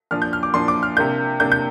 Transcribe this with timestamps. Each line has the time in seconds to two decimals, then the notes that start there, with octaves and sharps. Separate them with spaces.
0.11 A#2 F3 D4 F6
0.22 G6
0.33 F6
0.43 D6
0.54 A#2 F3 D4 C6
0.68 D6
0.83 F6
0.97 C3 A#3 D4 G6
1.40 C3 A#3 D4 G6
1.52 G6